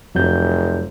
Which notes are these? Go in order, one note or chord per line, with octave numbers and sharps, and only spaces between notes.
F1 F2 F#3 G6